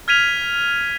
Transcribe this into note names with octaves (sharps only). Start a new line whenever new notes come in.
F6 G#6 B6 D#7 F7